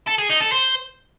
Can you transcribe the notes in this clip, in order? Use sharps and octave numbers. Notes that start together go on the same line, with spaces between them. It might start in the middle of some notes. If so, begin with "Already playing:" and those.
A4
G#4
D#4
A4
C5